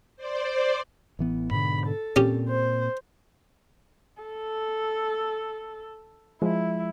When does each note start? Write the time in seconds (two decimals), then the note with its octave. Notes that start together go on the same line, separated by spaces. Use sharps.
0.16 C5 D5
1.19 A1 E3 B3
1.51 G#2 B2 D3 B5
1.86 A4
2.16 A#2 C4 C#4 G4
2.49 C5
4.23 A4
6.42 F3 G#3 E4